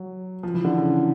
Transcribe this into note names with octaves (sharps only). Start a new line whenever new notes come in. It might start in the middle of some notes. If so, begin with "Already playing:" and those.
Already playing: F#3
F3
E3
D3
C#3